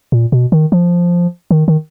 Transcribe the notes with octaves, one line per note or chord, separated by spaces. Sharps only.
A#2
B2
D#3
F3
D#3
D#3